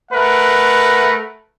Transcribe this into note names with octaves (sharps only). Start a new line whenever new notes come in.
A3 A#4 B4 F#5